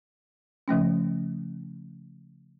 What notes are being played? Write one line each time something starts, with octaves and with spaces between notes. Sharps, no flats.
C#3 F3 A3 C#4